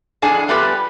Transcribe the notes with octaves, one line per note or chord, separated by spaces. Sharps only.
F2 A2 D4 G#4 F#5 G#5
G3 A3 B3 F4 G4 B4